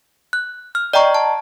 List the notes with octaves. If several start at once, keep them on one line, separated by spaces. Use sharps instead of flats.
F#6
F6
D5 D#5 G5 A#5 C#6
A5